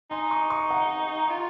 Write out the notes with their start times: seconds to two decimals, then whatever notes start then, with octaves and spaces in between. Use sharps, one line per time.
0.11 D#4 G#5 C6
0.31 A#5 C#6
0.50 A#5 C#6
0.70 F#5 A#5
1.30 F4